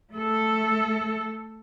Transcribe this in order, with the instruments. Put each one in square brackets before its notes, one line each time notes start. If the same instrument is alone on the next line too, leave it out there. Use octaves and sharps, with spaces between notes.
[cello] A3 A4